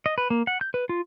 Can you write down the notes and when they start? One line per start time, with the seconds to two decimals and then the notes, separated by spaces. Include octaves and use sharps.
0.06 D#5
0.18 B4
0.30 A#3
0.47 F#5
0.61 G6
0.74 B4
0.89 F4